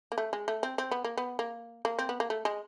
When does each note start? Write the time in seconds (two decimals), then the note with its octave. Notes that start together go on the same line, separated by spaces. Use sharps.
0.12 A#3
0.18 A3
0.33 G#3
0.48 A3
0.63 C4
0.78 C4
0.91 B3
1.04 A#3
1.17 B3
1.39 A#3
1.85 A#3
1.99 C4
2.09 B3
2.20 A#3
2.30 A3
2.45 G#3